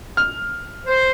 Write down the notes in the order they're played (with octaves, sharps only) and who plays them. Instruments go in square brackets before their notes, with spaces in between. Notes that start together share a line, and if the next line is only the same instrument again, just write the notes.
[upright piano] F6
[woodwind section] C5